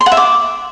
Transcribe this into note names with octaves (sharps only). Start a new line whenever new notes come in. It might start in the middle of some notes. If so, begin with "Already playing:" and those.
C6
F#5
E5
D6